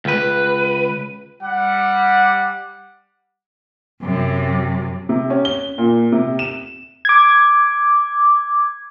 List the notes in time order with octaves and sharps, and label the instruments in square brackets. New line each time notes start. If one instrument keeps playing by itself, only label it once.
[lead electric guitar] C#2 B4
[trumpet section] G3 F#5
[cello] F#2 C3
[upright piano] C3
C#4
G7
A#2
C3
E7
[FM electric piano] D6 G#6